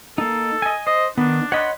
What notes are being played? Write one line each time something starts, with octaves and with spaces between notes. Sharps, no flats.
A#3 D#4 A4
D#5 G#5
C5 D#5
D#3 B3 D4
C#5 D#5 F#5 B5 C6